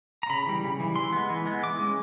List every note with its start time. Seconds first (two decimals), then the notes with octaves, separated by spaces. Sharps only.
0.23 A#5
0.30 C#3 B5
0.47 E3 G3
0.63 C#3
0.80 E3 G3
0.96 E3 C6
1.13 G#3 B3
1.30 E3
1.46 G#3 B3
1.63 E3 D6
1.79 G#3 C#4